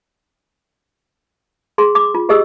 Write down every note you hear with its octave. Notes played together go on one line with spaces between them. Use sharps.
G#4 C6
D6
F4
G4 G#4 D#5 D#6 E6